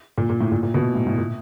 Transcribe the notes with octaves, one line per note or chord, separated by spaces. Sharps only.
A#2
A#2
A2
A#2
A#2
B2
A2
A2
A#2